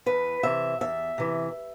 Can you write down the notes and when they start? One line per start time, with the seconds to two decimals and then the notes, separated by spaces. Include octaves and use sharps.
0.06 E2 B4
0.43 C3 E3 E5
0.81 E2 E5
1.18 C3 E3